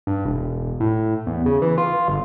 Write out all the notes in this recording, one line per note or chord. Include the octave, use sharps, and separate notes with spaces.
G2
E1
A2
E2
C#3
E3
F4
G1